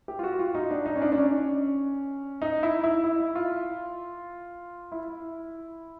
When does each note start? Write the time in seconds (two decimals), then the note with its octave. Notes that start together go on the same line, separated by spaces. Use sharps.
0.08 G4
0.19 F4
0.24 F#4
0.39 F4
0.55 D#4
0.71 D4
0.86 D#4
0.95 C#4
1.02 D4
1.12 D4
1.18 C#4
2.42 D#4
2.63 E4
2.84 E4
3.04 E4
3.35 F4
4.92 E4